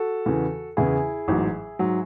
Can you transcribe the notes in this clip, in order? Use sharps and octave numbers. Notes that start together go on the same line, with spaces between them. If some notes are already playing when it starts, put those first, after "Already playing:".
Already playing: F#4 A4
E2 C#3 E3
E2 C#3 E3 E4 G#4
A1 G#2 F#3
G#2 F#3